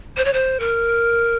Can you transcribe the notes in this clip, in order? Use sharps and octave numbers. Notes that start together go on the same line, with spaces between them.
C5
C#5
C5
A#4